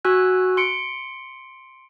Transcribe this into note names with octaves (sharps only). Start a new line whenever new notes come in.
F#4 G#5 E6 F#6
C6 C#7 D7